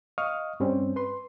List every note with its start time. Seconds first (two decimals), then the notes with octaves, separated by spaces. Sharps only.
0.18 D#5 F5 C#6 D#6 F6
0.60 G2 G3 C4 C#4
0.96 B4 C6